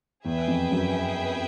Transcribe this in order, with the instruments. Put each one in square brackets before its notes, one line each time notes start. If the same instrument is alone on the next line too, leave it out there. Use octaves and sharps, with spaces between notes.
[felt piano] E2 [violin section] G#4 B4 E5 G5
[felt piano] F2
F#2